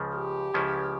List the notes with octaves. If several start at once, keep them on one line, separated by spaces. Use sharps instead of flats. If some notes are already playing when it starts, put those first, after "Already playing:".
Already playing: C#2 C#3 F3
G4
C#2 C#3 F3 C#4 E4